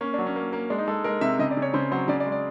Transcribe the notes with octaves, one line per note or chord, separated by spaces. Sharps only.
A#3 C#4
F#3 D4
C#4
A#3
A#3
G#3 D4
D#4
G#3 A4
G#3 A#4
C3 E5
C#3 D#5
D5
C#3
C#5
C#3 C5
F#3 C5
C#3 D5
D5
G#3
D5